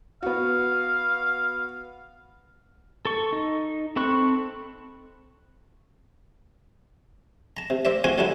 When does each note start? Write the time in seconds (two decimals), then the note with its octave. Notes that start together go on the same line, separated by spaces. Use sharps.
0.23 B3 F#4 F5
3.05 A4 C#6
3.33 D#4
3.96 C4 A4 B5 C#6 F#6
7.57 A5 A#5
7.70 C3
7.85 A#4 C5 D5 E5
8.04 C4 F4 F#4 G#4 G#5
8.18 D3 F#3 G3 D4 E4 G4